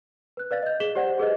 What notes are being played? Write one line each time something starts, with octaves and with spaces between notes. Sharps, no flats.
B4 F#6
B4 D5 F5 A6
D#5 G6
G#4 B6 E7 F#7 G7
G4 C5 D5 F#5
G4 G#4 B4 D#5